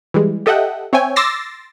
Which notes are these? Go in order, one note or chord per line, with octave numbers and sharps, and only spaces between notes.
E3 G3 G#3
G4 A4 D#5 E5 F#5 G5
C4 C#5 E5 G5 G#5
C6 D6 E6 A6 A#6 C7